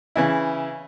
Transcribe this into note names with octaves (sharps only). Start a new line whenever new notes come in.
C#3 E3 E4